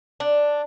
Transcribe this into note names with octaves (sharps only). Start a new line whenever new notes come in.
D4